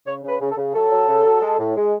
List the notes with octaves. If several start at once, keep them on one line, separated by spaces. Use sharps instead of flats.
C#3 C#5
C#3
B4
C#3
A4
C#3
F#3 A4
F#3
C#3
F#3
G#3
A2
G#3